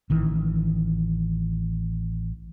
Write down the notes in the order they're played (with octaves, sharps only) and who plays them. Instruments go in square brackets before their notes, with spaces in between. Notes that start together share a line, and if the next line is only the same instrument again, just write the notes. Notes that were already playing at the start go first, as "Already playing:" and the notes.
[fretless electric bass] A1 D#3 E3